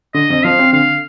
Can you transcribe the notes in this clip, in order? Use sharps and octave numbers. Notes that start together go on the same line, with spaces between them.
D3 D#5
F2
F3 F5
C4
D3 F5